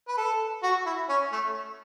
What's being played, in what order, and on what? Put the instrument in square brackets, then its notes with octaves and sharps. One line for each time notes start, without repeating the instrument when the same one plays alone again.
[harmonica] B4
A4
F#4
E4
C#4
A3